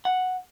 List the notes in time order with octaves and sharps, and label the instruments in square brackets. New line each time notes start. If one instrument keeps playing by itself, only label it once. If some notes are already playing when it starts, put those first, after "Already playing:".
[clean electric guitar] F#5